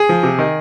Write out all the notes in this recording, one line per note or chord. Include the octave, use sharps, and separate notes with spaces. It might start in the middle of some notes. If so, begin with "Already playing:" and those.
Already playing: G#4
F3
C3
D#3